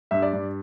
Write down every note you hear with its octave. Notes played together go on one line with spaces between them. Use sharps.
G2 E5
D5
G2